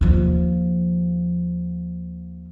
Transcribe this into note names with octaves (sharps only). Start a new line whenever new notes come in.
D#2 F3